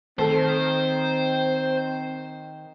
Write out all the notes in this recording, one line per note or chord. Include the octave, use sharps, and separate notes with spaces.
D#3 A3 C4 A4 C5